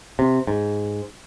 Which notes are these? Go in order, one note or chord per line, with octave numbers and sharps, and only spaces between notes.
C3
G#2